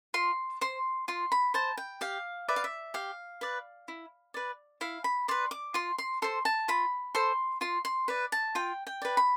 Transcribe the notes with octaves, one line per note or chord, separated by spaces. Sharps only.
F4 C6
C5 C6
F4 C6
B5
C5 A5
G5
G4 F5
B4 D5 E5
F5
E5
G4 F5
B4 D5
E4
B4 D5
E4 F5
B5
B4 D5 C6
D6
F4 C6
C6
A4 C5 C6
A5
F4 B5
A4 C5 C6
F4 C6
C6
B4 D5
A5
F4 G5
G5
B4 D5
B5